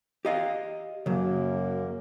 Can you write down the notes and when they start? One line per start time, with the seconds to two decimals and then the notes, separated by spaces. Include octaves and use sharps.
0.25 G4 D#5 F5
1.06 F#2 C#3 F#3 A#3